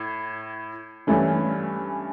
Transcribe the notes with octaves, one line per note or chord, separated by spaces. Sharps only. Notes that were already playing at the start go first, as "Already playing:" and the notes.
Already playing: A2
G2 E3 A3 C#4